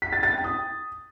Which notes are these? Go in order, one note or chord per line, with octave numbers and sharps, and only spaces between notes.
B6
A6
A6
G5
D#6